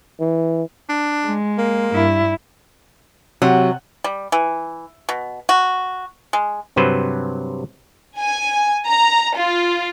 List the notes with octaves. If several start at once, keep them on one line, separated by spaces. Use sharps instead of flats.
E3
D4
G#3
A#3
G2 E4
C3 F#3
G3
E3
B2
F#4
G#3
G2 C3 F#3 B4 C5
G#5
A#5
F4